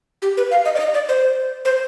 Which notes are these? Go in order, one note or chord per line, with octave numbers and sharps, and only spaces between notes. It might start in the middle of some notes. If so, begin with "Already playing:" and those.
G4
B4
F5
D#5
D5
D#5
D5
C5
C5